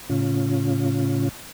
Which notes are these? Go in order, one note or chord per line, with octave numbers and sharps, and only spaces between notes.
A2 C#3 C#4 F4